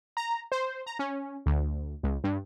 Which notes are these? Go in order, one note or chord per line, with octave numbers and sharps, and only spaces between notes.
A#5
C5
A#5
C#4
D2
C#2
G2